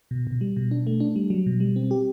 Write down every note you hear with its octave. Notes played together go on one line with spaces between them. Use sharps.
B2
B2
G3
B2
D4
A3
D4
G3
F#3
B2
G3
C4
G4